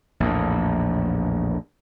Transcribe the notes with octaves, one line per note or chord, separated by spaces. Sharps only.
A#1 E2 A2